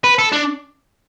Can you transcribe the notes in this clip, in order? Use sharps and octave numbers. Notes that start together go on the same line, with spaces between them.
B4
A4
D4